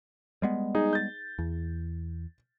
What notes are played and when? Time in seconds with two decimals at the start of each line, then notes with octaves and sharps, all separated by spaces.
0.42 G3 G#3 B3
0.75 D#4 G#4
0.93 G6 A6
1.39 E2